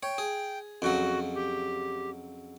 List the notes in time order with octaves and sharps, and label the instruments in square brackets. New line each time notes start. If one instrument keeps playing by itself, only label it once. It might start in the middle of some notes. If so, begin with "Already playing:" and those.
[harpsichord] C#5 [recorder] G5
[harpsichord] G#4
[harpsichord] F2 C#3 F#3 [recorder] F#4
[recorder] G4